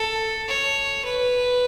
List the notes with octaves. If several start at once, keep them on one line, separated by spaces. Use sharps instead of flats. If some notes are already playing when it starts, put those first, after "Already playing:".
Already playing: A4
C#5
B4